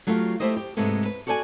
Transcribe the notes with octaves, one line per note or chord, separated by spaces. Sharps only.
F#3 A3 F4 G4 F5
A3 E4 G4 C5 D#5
G4
G#2 C3 G#3 A3 B3
B4
F#4 A4 D5 G5 G#5